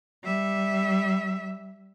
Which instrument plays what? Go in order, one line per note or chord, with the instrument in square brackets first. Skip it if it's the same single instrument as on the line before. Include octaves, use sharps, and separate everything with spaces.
[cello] G3 E5